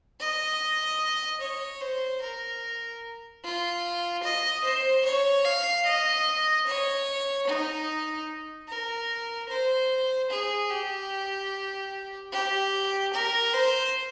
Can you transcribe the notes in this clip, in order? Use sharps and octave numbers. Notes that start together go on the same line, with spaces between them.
D#5
C#5
C5
A#4
F4
D#5
C5
C#5
F5
D#5
C#5
D#4
A#4
C5
G#4
G4
G4
A#4
C5